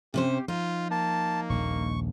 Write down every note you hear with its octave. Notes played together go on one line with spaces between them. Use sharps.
C3 C#4 G4 C5
F3 D#4 F4
A#3 A5
D#1 A#1 D#2 C#6